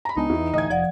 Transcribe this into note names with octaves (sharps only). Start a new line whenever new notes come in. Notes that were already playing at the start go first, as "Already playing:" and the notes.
A#5 B5
C#2 G#3 B3 D4 D#4
E2 E3
A1 D2 E3 D#5 G#6
F1 F3 D5 F#5